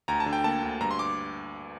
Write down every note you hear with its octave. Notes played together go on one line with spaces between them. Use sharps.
D2 A#5
A5
D3
G5
A#3 A5
D2
G2 A#5
C6
D6